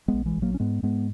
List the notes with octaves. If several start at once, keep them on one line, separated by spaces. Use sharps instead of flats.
G#3 B3
A#1
E3 G#3
A#1
F#3 A#3
C#4
G#2 G#3 B3
G#2 G#3 B3